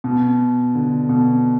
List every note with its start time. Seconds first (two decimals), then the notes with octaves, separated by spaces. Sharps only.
0.04 B2
0.75 D3
1.09 B2